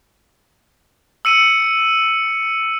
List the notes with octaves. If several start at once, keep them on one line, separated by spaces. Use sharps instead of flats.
E6 C#7 D#7